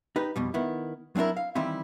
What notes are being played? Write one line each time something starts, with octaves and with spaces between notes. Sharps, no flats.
D#4 G4 B4
F2 B2 G3
D#3 B3 E4
F#3 C4 D4 E4 A#4
F5
D#3 E3 G3 C4 E4